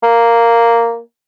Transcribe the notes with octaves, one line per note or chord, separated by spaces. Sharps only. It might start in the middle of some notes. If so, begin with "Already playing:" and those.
A#3